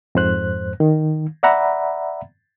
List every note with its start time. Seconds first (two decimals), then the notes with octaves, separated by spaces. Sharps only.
0.15 F2 G#2 C5 F#6
0.80 D#3
1.43 D5 E5 F#5 A#5 B5